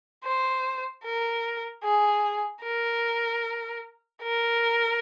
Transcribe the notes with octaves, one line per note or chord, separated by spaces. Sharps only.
C5
A#4
G#4
A#4
A#4